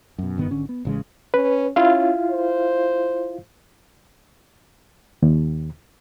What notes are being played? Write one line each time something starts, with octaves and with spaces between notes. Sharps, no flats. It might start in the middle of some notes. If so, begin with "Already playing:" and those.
F#2 B2
F#1 G2 D#3 B3
G#1 D3 C#4
B3
A1 C#3 G#3
C#4 B4
C#4 E4 F4 F5
C5
D#2